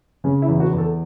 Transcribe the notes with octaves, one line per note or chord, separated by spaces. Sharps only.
C#3 C#4
E4
E2
F#4
E2
A4